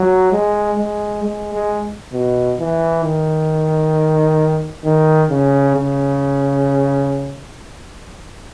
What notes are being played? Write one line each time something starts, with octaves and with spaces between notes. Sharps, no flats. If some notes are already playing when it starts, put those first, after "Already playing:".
Already playing: F#3
G#3
G#3
G#3
G#3
B2
E3
D#3
D#3
C#3
C#3